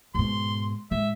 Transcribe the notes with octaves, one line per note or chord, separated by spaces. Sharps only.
G#2 B2 C6
A2 G#3 E5